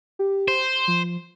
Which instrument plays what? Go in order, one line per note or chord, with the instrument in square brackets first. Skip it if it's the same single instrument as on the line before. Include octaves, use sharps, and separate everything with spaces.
[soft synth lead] G4
[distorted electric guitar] C5
[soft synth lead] F3